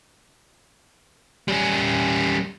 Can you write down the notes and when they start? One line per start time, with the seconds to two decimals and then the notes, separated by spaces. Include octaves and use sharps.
1.48 G3 C#4